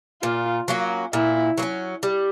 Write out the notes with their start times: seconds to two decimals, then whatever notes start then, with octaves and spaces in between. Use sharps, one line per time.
0.22 A#2 F4
0.68 F#3 A#3 C#4
1.13 A#2 E4
1.58 F#3 A#3
1.62 C#4
2.03 G3